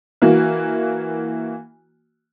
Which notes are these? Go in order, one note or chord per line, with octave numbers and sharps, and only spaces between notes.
E3 A#3 F#4